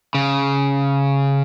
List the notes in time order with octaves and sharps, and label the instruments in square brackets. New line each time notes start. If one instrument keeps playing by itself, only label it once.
[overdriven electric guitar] C#3